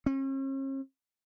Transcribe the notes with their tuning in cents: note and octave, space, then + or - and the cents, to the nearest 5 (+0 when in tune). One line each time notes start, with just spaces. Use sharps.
C#4 -45